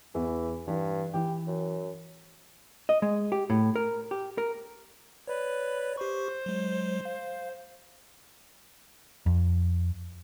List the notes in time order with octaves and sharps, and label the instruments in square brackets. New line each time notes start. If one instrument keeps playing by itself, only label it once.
[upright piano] E2 [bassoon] E3
[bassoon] G2 [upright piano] E3
[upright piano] E3 [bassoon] G4
[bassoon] F#2
[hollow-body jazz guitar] D#5
G#3
G4
A2
A#4
G4
A#4
[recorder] B4 [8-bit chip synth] C#5 D5
[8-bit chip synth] G4 C#6 [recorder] C5
[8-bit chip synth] F#3 G#3
F5
[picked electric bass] F2